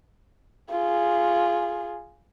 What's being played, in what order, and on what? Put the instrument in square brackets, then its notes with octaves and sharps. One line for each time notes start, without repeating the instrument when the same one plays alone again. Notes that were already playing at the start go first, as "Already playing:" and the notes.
[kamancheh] F4 G#4